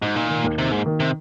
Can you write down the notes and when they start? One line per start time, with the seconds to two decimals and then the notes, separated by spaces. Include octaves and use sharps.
0.01 G#2 D#4
0.15 A#2 A#3
0.30 D#3
0.44 D#2
0.58 C3 D#4
0.72 G#2 A#3
0.86 D#3
1.00 C3